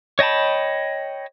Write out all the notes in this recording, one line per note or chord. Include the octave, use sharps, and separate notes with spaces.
C#5 D#5 G5 A5 B5